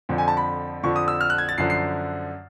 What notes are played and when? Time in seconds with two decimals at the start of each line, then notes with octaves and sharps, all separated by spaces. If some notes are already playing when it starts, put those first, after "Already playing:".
0.09 F2 D3 F3
0.18 G#5
0.28 A5
0.37 B5
0.83 F2 D3 F3 C#6
0.96 D#6
1.08 E6
1.21 F6
1.30 F#6
1.38 G#6
1.49 A6
1.58 F#2 D3 F3 C7
1.70 C7